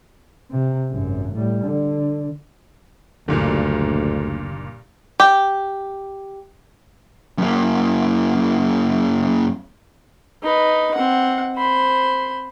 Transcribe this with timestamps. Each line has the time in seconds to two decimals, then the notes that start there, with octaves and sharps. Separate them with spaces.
0.51 C3
0.91 G#1 F#2
1.34 A2 G3
1.63 D3
3.28 F#1 D2 G2 A#2 D3 D#3
5.20 G4
7.38 F#2 A#3
10.43 D#4 B4
10.95 C4 F#5
11.56 C5 B5